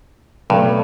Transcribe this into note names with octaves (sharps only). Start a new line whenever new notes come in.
G2 B2 F#3 A3